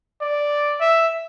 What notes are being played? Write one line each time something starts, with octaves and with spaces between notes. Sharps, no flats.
D5
E5